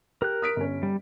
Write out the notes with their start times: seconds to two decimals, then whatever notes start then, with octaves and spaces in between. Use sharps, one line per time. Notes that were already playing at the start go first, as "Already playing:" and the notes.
0.22 G4 A#4 F#6
0.42 D#6 B6 D7
0.56 G1 C#4
0.83 G3